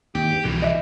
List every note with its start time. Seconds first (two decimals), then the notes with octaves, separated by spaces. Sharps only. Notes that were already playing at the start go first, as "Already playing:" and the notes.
0.15 D#2 G4
0.30 G2
0.44 C2 F2 B2 D3 E3
0.62 D#5 E5